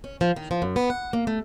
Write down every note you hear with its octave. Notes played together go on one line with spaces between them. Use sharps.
C#4
F3
D#3
F3
F#2
B3
F#5
A#3
A3